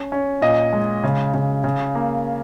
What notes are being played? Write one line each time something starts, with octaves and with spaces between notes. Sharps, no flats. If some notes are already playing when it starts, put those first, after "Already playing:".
Already playing: C#4
C#4
A#2 D#5
G#3
C#3
C#3
C#3
A#3